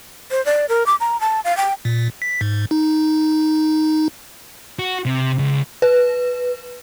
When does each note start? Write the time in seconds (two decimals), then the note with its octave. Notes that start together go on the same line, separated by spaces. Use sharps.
0.31 C5
0.45 D5
0.69 A#4
0.86 D6
1.00 A#5
1.20 A5
1.44 F5
1.57 G5
1.85 A#2
2.22 B6
2.41 G#2
2.71 D#4
4.79 F#4
5.06 C3
5.39 C#2
5.82 B4